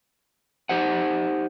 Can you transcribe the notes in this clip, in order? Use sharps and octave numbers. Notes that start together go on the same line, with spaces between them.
D#4 G4 C5 F#5